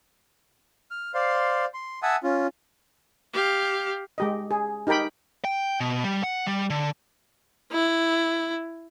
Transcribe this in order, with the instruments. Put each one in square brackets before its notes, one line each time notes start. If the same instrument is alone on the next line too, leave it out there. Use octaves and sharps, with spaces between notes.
[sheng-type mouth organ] F6
C5 D5 F5 C6
C6
E5 F#5 G#5 A5 D#6 E6
C#4 F4
[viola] G4 F5
[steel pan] G#3 G4 D#5
G#4
D#4 G4 A#4 G5 B5
[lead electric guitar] G5
B2
G3
F#5
G3
D3
[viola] E4